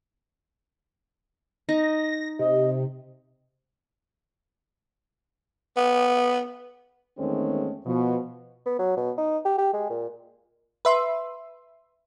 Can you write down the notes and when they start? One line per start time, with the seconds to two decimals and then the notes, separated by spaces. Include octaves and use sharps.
1.69 D#4 A#6
2.39 C3 D#5
5.77 B3
7.19 E2 D#3 G#3 A3 C4 C#4
7.86 B2 F3
8.66 B3
8.79 F#3
8.97 B2
9.18 D#4
9.45 G4
9.58 G4
9.74 G#3
9.90 A#2
10.85 B4 E5 C6